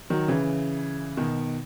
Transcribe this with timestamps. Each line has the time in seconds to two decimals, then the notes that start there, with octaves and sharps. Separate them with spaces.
0.10 D#3 F#3
0.28 C#3 E3
1.17 B2 D#3